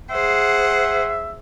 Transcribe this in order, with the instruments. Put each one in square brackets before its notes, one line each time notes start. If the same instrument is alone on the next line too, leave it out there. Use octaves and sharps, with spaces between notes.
[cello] G#4 C5 [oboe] E5 [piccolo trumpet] F#5